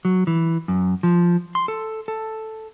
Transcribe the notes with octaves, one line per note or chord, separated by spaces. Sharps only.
F#3
E3
F#2
F3
C6
A4
A4